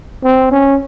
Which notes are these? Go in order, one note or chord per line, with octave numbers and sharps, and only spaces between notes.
C4
C#4